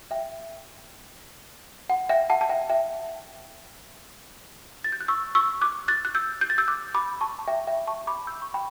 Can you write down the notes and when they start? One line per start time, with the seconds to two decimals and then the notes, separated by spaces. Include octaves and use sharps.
0.11 E5 G5
1.90 F#5
2.09 E5 G5
2.30 F#5 A5
2.41 A5
2.49 E5 G5
2.69 E5 G5
4.84 A6
4.92 G6
5.01 F#6
5.08 C#6 E6
5.35 C#6 E6
5.61 D6 F#6
5.88 F#6 A6
6.05 F#6
6.15 E6 G6
6.41 G6
6.50 A6
6.58 E6 G6
6.68 D6 F#6
6.95 B5 D6
7.21 A5 C#6
7.39 A5
7.48 E5 G5
7.67 E5 G5
7.87 A5 C#6
8.07 B5 D6
8.27 E6 G6
8.42 C#6
8.54 G5 B5